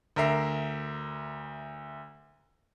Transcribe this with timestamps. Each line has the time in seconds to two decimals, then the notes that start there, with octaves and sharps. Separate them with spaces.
0.16 D2 A#4 E5 C7